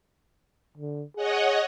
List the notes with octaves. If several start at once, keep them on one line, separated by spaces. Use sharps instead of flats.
D3
G#4 C#5 D#5 F#5